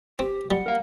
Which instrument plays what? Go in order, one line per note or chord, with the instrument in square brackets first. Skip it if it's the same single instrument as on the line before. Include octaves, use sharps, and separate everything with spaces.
[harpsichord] C4 [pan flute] G4
[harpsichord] G3 [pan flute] F#5
[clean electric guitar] A#4 F5